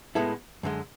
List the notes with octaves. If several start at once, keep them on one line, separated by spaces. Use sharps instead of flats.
A2 G#3 B3 E4 A4
F#2 D3 G#3